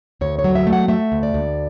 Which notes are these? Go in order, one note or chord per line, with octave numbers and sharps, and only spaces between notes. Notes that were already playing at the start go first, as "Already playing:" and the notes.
D2 C#5
C#5
F#3
E5
A3
F#5
A3 E5
D2
D5
D2